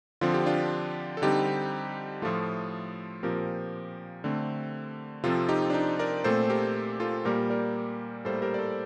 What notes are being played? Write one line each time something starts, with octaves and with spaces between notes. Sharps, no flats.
D3 F3 C4 F4
G4
D4 F4
A4
D3 G3 C4 D#4 G4
A2 F3 A3 F4 A4
A#2 F3 C4 G4 A#4
D3 A3 C4
C3 F3 C4 F4 A4
D#4 G4
D4
D#4
A#4 D5
A#2 A3 C4 A4 C5
G4 A#4
F4 A4
A#2 G3 A#3 G4 A#4
A#4 D5
A2 G3 A#3 A4 C5
G4 A#4
D5
A4 C5